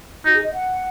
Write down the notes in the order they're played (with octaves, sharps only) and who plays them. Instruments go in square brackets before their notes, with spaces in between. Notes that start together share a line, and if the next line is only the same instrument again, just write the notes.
[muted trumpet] D#4 [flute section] F#4
[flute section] G#4
D#5
F#5